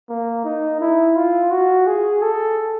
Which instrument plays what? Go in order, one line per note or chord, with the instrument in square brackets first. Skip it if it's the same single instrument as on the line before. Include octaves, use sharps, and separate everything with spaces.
[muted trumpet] A#3
D#4
E4
F4
F#4
G#4
A4